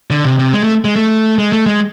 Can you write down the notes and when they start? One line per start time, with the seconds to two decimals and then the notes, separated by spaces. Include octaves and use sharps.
0.10 D3
0.24 C3
0.39 C3
0.53 G#3
0.64 A3
0.85 G#3
0.96 A3
1.38 G#3
1.52 A3
1.66 G#3